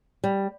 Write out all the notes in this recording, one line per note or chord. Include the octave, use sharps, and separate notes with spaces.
G3